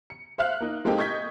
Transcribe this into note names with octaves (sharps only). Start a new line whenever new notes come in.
C#7
C5 E5 F5 F6 F#6
A#3 D#4
G#3 A#3 C4 D#4 G4 A4
D#5 C#6 G6 G#6 B6